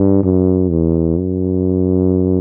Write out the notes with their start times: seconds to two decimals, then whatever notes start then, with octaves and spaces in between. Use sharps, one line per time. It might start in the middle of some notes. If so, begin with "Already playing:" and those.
Already playing: G2
0.23 F#2
0.71 E2
1.18 F#2